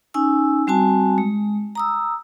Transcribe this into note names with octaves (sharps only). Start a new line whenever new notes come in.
C#4 D#4 G#5 E6
G3 C4 F#4 G#5 A5
G#3
A#5 D#6 E6